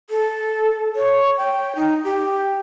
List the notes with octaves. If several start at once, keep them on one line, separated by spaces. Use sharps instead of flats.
A4
C#5
G5
D#4
G4